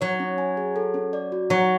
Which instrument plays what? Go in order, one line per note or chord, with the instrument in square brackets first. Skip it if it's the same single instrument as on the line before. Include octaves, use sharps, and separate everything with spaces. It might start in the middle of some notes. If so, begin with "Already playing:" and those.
[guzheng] F#3 [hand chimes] C#5
[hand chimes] C#4
G#5
G#4
A4
C#4
D5
F#4
[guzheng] F#3 [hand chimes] F#5